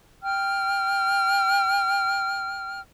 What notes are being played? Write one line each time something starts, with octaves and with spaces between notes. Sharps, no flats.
G5 F6